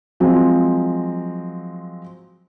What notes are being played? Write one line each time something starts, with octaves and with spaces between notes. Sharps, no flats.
F3 F#3 G#3 C4